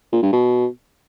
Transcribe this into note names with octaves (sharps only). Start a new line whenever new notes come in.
A#2
G2
B2